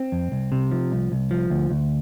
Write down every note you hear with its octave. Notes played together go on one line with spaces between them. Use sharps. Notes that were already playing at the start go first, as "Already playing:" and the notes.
Already playing: C4
F2
C2
C3
F3
C2
C2
F3
D2
D2